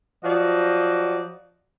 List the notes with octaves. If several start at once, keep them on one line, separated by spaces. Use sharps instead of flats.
F3 F#3 F#4 D5 D#5